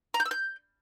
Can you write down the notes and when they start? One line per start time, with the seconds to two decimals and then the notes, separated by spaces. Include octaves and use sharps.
0.14 A#5
0.20 G6
0.25 E6
0.31 G6